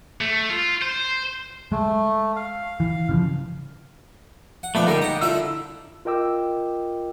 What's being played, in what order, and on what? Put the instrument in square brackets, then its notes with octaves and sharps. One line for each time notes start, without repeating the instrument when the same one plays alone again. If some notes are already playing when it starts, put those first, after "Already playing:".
[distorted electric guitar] A3
F4
C5
[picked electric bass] G#3 [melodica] A3
[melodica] F5
[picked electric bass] E3
C#3 E3 F3
[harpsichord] F#5
[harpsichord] F3 A4 [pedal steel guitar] A3 B3 D4
[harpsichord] D3 G3 A#3 [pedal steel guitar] D#4 G4
[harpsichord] F#5 A#5
[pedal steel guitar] D3 E6 [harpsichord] E4 F4 A4
[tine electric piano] F4 A#4 D#5 G5 D6 E6